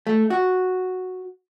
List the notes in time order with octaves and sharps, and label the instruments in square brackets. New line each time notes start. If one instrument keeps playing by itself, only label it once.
[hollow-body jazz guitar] A3
F#4